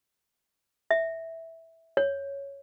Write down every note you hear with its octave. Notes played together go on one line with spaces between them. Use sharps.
E5
C#5